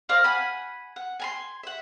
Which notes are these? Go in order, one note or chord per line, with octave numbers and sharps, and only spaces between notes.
A#4 C5 D5 F5
F#5 G#5 B5
F#5
G#5 A#5 C6
E5 F#5